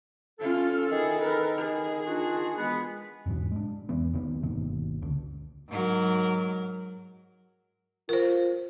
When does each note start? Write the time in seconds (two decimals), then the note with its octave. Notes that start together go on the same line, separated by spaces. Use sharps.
0.40 C#4 F4 A4
0.92 D#3 E4 G#4
1.23 A#4 B4
1.60 G#4
2.06 D4 F4 F#4
2.57 E3 G#3 B3
3.26 E2 G#2 B2
3.52 G#3 D4
3.89 E2 E3 B3
4.14 D#2 C3 D#3 B3
4.43 G1 B2 D#3 A#3
5.02 C#2 D3
5.69 G#2 F#3 A#4
8.09 F4 A#4 C5